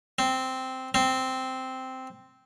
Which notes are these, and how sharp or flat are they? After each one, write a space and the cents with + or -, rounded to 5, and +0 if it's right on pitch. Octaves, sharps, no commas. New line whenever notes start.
C4 -5
C4 -5